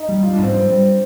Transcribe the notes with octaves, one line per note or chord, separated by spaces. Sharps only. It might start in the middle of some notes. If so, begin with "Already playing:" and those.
Already playing: D#4
G3
G3 F4
D4
G#2 C4
G3 C4
G3